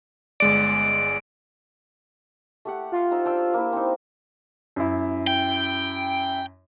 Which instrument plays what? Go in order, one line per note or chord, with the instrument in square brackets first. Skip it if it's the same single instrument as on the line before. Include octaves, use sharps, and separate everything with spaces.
[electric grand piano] G1 G#3 D5 [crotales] D7
[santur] A3 G4 F#5
[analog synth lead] F4
[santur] D#4 C5 E6
D4 G5 E6
A#3 E4
C4 D#4
[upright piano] F#2 E4
[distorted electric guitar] G5